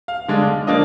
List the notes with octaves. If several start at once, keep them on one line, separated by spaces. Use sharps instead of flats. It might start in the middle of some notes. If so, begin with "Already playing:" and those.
F5
D3 G#3 D4
D3 F3 A#3 D4 D#5